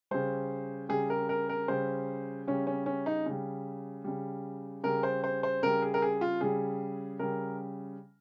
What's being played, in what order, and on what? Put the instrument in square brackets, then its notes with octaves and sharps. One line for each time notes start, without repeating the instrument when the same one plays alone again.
[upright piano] C#3 G3 C5
C#3 G3 G#4
A#4
A#4
A#4
C#3 G3 C5
C#3 G3 C#4
C#4
C#4
D#4
C#3 G3
C#3 G3
C#3 G3 A#4
C5
C5
C5
C#3 G3 A#4
G#4
A#4
G#4
F4
C#3 G3 G#4
C#3 G3 A#4